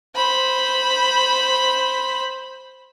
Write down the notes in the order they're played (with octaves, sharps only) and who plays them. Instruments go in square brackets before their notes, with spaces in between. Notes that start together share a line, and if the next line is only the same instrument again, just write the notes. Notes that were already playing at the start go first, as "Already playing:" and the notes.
[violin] C5 B5